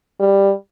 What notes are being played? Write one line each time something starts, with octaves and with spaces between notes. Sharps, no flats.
G3